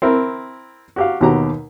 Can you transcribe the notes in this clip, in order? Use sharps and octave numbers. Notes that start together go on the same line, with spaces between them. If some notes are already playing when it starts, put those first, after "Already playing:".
C4 E4 A#4
F#4 G4 F5
D#2 B2 F#4 G4 A#5